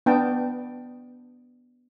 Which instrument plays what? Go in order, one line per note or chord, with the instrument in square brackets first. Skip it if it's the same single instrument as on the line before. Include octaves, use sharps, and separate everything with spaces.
[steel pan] B3 D4 G5 A5